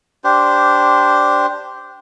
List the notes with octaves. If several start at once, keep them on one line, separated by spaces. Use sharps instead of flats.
D4 G4 C5